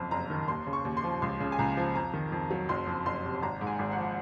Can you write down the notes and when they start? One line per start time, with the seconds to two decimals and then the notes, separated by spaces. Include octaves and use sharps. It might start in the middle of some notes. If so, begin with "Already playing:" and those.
Already playing: F#1 F2
0.11 F#1 A#5
0.30 D#3
0.48 D#2 C6
0.67 C#3
0.73 C#6
0.85 D#2
0.97 C6
1.04 F3
1.22 C#2 C6
1.40 C#3
1.52 G#5
1.59 C#2 A#5
1.77 F3
1.96 F2 A#5
2.14 D#3
2.32 F2
2.50 F#3
2.69 F#1 C6
2.87 F2
3.06 F#1 C6
3.24 C3
3.42 G#1 A#5
3.61 G#2
3.67 G#5
3.79 G#1
3.92 F#5
3.97 F3